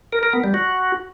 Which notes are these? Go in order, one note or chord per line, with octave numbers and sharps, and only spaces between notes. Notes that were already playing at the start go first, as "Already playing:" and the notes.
A#4
A#4
B3
G3
F#4